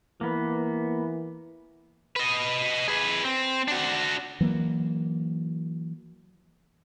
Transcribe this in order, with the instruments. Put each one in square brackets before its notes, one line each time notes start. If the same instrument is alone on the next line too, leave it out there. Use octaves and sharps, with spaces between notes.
[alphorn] E3 [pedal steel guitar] A#3 B3
[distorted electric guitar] B4 D#5
G#4 B4
C4
D4 F#4
[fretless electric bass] E3 F#3 A#3